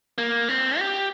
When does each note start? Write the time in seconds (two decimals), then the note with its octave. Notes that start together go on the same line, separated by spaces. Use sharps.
0.18 A#3
0.49 C4
0.79 G4